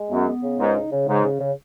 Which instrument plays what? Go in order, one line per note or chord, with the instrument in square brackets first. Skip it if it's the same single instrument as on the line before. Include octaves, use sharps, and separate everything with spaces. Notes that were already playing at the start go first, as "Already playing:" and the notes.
Already playing: [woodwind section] G#3
[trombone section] F#2 [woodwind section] B3
[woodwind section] B3
C#3
[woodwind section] C#2 [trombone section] G#2
[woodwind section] D#4
C#3
[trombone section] G#2 [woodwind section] C#3
[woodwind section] C#3
C#3